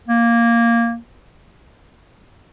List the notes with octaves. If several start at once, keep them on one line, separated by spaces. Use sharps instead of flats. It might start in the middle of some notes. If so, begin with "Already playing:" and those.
A#3